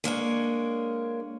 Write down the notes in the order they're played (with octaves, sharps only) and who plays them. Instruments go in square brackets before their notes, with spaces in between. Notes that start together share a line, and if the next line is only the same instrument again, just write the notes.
[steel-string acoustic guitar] G#3 A#3 D4 C#5